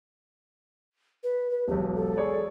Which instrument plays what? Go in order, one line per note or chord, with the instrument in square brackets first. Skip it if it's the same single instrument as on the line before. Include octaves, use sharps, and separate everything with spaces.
[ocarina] B4
B4
[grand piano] E1 B1 [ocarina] G4
[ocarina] A4
[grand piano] G#4 C#5 D5